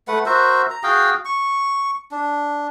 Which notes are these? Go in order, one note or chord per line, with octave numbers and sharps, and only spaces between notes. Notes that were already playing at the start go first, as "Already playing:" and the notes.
A3 B4 F#5
F#4 A#4 C5 E5
A#5
F#4 G#4 F5 G5
C#6
D4